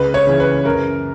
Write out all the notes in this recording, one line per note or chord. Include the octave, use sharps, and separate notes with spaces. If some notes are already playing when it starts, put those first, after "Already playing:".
Already playing: C#2 B4
C#5
C#3 E3
B4
F#2 A#4